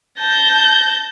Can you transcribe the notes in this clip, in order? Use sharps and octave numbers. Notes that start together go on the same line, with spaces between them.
A5 G6 A#6